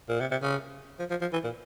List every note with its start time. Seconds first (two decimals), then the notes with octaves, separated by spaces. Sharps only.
0.09 A#2
0.20 C3
0.31 C3
0.42 C#3
0.99 F3
1.10 F3
1.21 F3
1.33 E3
1.44 A#2